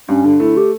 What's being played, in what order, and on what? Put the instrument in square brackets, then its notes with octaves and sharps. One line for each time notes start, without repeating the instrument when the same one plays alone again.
[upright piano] G2 [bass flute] C#4
[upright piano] D3 [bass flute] D4
[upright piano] A3 [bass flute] E4
[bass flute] G4